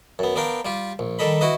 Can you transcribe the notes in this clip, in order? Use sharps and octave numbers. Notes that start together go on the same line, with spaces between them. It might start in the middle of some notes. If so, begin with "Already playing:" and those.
F#2 B3
B3 D4 A#4 F5 G5
G3 F4 G4
A#1
D#3 G3 A4 D#5 B5
E4 F#4 B4 D#5